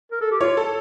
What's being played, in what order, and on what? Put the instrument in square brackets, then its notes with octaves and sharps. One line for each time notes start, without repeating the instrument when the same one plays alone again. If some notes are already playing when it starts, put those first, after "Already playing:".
[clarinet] A#4
A4
G4
[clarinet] F4 [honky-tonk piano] C#5
[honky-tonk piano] A4